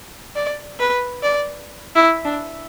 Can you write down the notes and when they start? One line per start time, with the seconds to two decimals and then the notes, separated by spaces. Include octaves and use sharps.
0.35 D5
0.79 B4
1.23 D5
1.96 E4
2.25 D4